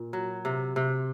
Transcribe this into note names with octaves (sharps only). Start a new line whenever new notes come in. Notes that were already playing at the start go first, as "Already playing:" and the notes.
Already playing: A#2
F#3
C3
C3